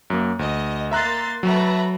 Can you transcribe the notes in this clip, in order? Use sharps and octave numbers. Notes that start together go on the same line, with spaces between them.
F#2 A#3
D2 D#5
A#3 E5 A#5 C6 F#6 A6
F#3 A3 B4 A#5